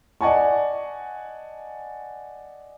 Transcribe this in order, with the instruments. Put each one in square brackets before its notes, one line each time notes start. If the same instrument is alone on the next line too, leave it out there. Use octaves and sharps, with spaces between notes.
[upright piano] D5 D#5 F#5 G#5 A5 C#6